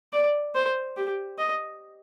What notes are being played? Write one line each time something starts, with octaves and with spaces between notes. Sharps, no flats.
D5
C5
G4
D#5